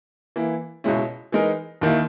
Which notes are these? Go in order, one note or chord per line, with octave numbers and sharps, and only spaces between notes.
E3 A#3 E4
C#2 B2 G#3 C#4 E4
E3 G#3 D#4 A#4
D#2 D#3 A#3 E4